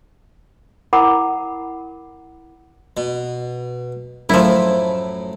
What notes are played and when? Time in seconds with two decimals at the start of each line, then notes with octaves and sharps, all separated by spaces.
0.93 E4 A#4 F#5 B5 D6
2.97 B2
4.29 F#2 A2 F3 A3 E4